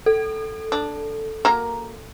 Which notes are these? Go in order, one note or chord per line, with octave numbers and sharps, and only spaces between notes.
A4
D4
A#3 F#4 A#4